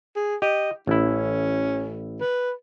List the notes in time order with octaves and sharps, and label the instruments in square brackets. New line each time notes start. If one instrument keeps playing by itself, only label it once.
[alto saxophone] G#4
[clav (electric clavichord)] G4 [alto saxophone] D#5
[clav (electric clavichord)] A1 E4 [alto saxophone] C#4
[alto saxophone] B4